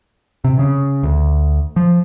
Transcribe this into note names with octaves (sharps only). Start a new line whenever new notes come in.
C3
C#3
D2
F3